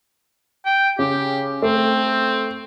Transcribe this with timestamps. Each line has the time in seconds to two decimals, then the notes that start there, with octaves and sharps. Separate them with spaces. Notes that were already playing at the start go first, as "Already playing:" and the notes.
0.66 G5
0.99 C#3 G4
1.62 A3 C4